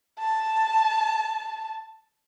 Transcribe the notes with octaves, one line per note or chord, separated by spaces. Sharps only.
A5